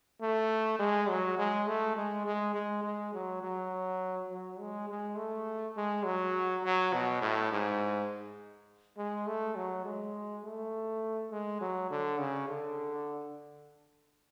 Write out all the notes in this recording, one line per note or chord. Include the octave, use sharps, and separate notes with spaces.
A3
G#3
F#3
G#3
A3
G#3
G#3
G#3
G#3
F#3
F#3
F#3
G#3
G#3
A3
G#3
F#3
F#3
B2
A2
G#2
G#3
A3
F#3
G#3
A3
G#3
F#3
D3
C#3
D3